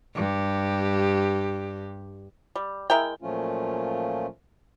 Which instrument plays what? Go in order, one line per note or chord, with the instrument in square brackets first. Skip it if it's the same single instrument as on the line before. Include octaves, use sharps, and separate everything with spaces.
[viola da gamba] G2 G4
[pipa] G3
G#3 E4 A#4 G5
[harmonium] A#2 F3 F#3 A3 C#4 F4